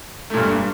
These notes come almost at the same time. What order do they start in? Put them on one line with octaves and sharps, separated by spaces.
A3 A#2 G2